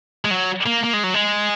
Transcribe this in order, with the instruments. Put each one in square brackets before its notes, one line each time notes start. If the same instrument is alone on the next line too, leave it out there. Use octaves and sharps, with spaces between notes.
[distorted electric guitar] G#3
F#3
A#3
A#3
G#3
F#3
G#3